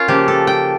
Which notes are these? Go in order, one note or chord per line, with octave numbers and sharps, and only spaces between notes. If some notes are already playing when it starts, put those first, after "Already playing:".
Already playing: C#4 F4 A#4 C#5
C#3 F3 A#3 G4
A4
G5